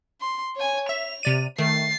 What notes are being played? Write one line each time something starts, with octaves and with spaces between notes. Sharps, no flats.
C6
C#5 G#5
E5 F7
C3 D5 D#7
D#3 A3 A6 C7